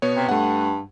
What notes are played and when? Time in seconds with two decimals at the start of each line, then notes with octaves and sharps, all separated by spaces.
0.02 B2 B3 C#5
0.15 C3
0.29 G2 A3 F#5